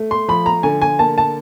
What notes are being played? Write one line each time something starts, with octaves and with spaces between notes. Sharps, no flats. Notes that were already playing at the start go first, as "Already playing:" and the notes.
Already playing: A3
C6
F3 B5
A#5
D3 G#5
G#5
A#3 A5
A5